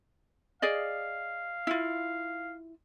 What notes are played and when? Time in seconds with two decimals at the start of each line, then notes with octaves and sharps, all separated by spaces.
0.62 G#4 D5 D#5 F5
1.67 E4 F4